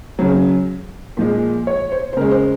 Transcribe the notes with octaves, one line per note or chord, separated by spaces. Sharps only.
C#3 F#3
A#2 F3 G#3
C#5
C5
C5
C#3 G#3 A#4
C5